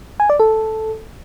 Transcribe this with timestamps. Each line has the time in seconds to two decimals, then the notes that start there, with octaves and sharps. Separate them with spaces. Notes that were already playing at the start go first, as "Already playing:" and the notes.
0.20 G#5
0.30 D5
0.40 A4